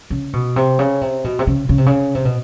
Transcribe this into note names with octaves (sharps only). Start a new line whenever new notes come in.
C#3
B2
C3
C#3
C3
B2
C3
C#3
C#3
C3
C#3
C3
B2